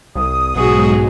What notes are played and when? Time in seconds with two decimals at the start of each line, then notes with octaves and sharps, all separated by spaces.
0.15 C2 D#6
0.56 B1 G#2 B2 F#3 G#3 F#4 G#4